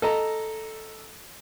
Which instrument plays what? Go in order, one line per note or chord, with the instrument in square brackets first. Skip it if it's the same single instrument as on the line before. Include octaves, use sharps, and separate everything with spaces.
[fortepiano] A4 D#5 A#5